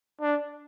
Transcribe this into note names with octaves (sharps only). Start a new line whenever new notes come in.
D4